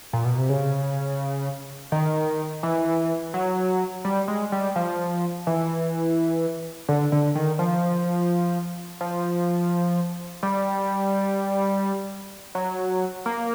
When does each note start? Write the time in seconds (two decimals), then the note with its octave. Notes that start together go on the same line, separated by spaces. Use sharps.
0.13 A#2
0.25 B2
0.38 C3
0.49 C#3
1.92 D#3
2.63 E3
3.34 F#3
4.05 G3
4.28 G#3
4.52 G3
4.76 F3
5.47 E3
6.89 D3
7.12 D3
7.36 D#3
7.59 F3
9.01 F3
10.43 G3
12.55 F#3
13.26 A#3